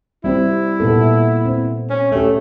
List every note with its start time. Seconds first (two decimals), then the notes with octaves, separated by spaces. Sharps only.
0.24 G3 C4 E4 G4
0.80 A#2 B3 A4
1.45 C4
1.90 C#4
2.12 A3 C#4 G4